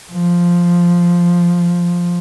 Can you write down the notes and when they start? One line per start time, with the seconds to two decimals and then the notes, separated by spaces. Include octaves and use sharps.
0.13 F3